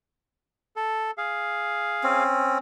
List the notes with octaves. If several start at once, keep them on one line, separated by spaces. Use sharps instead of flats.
A4
G#4 F5
C4 C#4